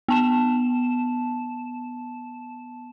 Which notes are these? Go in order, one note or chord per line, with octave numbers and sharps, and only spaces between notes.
B3 A5 E7